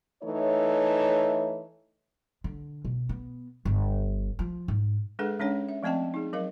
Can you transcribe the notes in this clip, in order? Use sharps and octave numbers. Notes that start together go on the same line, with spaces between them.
E3 A3 D#4 C#5
D3
B2
B3
G1
F3
G#2
G#3 D4 G#4 A4 B4 F#5
G#3 C#4 D4 C#5 F#5
E5
F3 A3 C4 D#5 G5 A5
D#4 G#4
F#3 A#4 D#5 F5